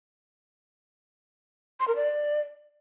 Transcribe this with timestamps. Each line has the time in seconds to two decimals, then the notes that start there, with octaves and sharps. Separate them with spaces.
1.80 C6
1.88 A#4
1.96 D5